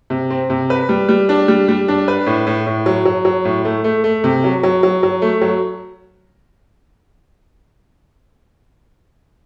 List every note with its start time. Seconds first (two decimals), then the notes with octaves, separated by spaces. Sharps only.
0.10 C3
0.30 C4
0.50 C3
0.70 B4
0.89 G3
1.09 G3
1.29 D4
1.48 G3
1.68 G3
1.88 D4
2.08 B4
2.26 A2
2.47 A2
2.67 A2
2.86 F#3
3.05 F#3
3.25 F#3
3.45 A2
3.65 A3
3.84 A3
4.04 A3
4.24 C3
4.44 F#3
4.63 F#3
4.83 F#3
5.03 F#3
5.22 A3
5.41 F#3